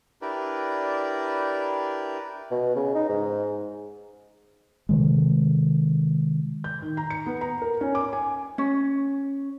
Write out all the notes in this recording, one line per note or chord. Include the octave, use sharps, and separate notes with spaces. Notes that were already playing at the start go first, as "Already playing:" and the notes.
D4 E4 G4 A#4 B4 D5
B2
C#3
D#4
G#2
C3 D#3 G#3
G6
D#3
A#5
C#7
B3
A#5
A#4
C#4
D6
G#5
C#4